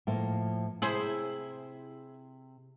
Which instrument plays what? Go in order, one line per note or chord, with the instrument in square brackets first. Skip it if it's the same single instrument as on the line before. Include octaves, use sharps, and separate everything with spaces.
[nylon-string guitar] A2 F3 A#3
[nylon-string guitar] C3 [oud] E4 G#4 C5